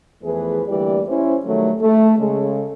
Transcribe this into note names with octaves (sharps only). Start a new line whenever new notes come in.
E2 E3 F3 A3 G#4 B4
D2 E3 G3 A#3 G4 D5
C#4 E4 C5
D#3 F#3 G3 A3
A3
C#3 G#3 A4